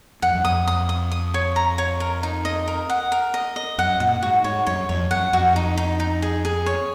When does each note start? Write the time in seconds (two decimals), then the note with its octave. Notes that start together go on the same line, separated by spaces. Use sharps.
0.22 F2 F#5
0.35 F#2
0.45 F2 D#6
0.68 D#6
0.89 D#6
1.12 D#6
1.34 C#5
1.56 A#5
1.78 C#5
2.00 A#4
2.23 D#4
2.45 D#5
2.68 A#4
2.90 F#5
3.12 A#4
3.34 D#5
3.56 D#5
3.78 F#2 F#5
4.00 A#2 F#5
4.22 G#2 F#4
4.44 G#2 C#5
4.67 F#2 C#5
4.89 F2 C#5
5.11 F#2 F#5
5.33 F2 F#4
5.56 D#4
5.77 D#4
6.00 D#4
6.22 G#4
6.45 G#4
6.66 C#5